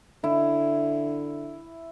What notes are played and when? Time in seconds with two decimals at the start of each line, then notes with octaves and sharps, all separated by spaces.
0.24 D3 E4